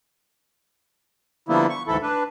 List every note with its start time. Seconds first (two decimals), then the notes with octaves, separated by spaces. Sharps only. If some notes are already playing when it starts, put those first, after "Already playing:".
1.48 D3 F3 G3 A#3 B3 E4
1.70 C#6
1.88 D2 G#2 E3 E4 A4
2.02 D4 B4